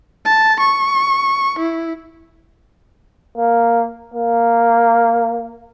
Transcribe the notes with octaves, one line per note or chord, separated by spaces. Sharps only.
A5
C#6
E4
A#3
A#3